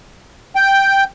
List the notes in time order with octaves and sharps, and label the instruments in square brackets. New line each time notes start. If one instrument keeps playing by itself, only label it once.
[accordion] G5